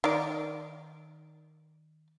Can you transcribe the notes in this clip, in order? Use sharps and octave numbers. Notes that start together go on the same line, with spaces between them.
D#3 D5